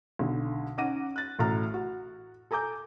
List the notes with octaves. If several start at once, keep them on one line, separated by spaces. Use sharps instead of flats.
B1 D3
C#4 D#4 F#5 D6 A#6 D#7
F#6 A6
A1 A2 A3 F#4 A#5 F6
F#4
A4 G#5 A#5 D6 G6